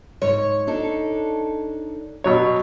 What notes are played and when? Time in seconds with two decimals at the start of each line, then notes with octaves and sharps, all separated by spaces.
0.22 G#2 C#5
0.67 D4 D#4 A4
2.24 B2 F#3 C#5